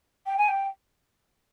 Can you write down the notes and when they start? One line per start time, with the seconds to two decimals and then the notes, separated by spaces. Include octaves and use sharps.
0.26 G5
0.37 G#5
0.48 G5